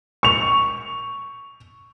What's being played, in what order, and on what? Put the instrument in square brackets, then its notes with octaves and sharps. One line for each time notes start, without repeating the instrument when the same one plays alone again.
[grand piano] C#6 F7